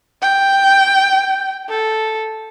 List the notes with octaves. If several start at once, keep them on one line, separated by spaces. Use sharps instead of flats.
G5
A4